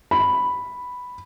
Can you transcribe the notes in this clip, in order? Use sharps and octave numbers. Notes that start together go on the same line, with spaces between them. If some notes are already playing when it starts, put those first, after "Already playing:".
B5